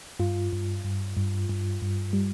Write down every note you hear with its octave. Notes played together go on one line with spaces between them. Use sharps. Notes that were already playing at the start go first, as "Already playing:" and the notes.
G2 F4
G2
G2
G2
G2
G2
G3